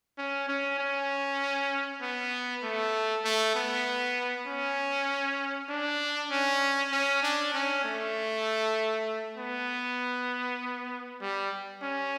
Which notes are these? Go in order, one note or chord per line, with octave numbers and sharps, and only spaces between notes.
C#4
C#4
C#4
B3
A3
A3
B3
C#4
D4
C#4
C#4
D4
C#4
A3
B3
G3
C#4